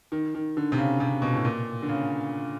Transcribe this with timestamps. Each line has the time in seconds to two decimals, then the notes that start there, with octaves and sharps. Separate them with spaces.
0.12 D#3
0.35 D#3
0.57 D3
0.72 C3
0.78 C#3
1.00 C3
1.22 B2
1.34 A2
1.45 A#2
1.82 D3
1.89 C#3